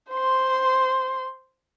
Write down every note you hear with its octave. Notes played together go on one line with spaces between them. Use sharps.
C5 C6